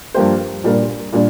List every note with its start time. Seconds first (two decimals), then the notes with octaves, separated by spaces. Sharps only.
0.14 G2 F3 A#3 G4 C5
0.64 A#2 G3 D4 A#4
1.13 A#2 G3 D4